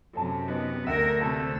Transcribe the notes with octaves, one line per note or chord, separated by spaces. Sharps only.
F#2 C3 A4 A5
B3 D#4 B4
D2 A#4 E5 F#5 G5 E6
C3 A3 C5 A5 B5